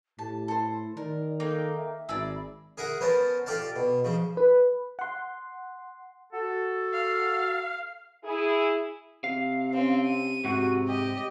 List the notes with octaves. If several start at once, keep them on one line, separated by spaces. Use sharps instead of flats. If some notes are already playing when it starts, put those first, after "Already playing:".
A2 G4 A5
E4 A4 C5
D#3 A#4 D5
A#3 D#4 A4 G5
E5
G#1 G#4 D5 A#5 B5 E6
G#4 A#4 E5 F#5
B3 C#4 A#4 C5 A5
F4 G4 A4 D5 F5 A5
B2
C#3 F3
B4
F#5 C6
F#4 A4
F5
E4 G#4
C3 F5
C4 C#4
D#7
G#2 C3 F#4
G4 D#5